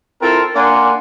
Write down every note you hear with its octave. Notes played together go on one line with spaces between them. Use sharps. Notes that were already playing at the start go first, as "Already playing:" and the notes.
C4 E4 F4 A4 A#4 C6
A#3 D4 D5 F#5 G#5 C6